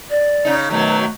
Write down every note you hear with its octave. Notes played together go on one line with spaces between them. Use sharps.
D5
C#3 D#4
B2 D#3 F#3 A3